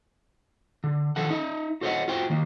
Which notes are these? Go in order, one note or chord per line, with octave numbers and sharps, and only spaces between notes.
D3
D#3 F3 A4 F#5
D#4 E5
F#4 A4 C5 C#5 D#5 F#5
F4 F#4 C5 G5
D#3 A#3